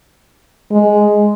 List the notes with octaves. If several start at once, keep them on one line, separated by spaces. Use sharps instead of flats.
G#3